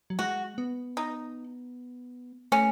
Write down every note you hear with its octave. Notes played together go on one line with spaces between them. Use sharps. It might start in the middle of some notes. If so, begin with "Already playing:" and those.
F#3
G#3 F#4
B3
D#4
A3 C#4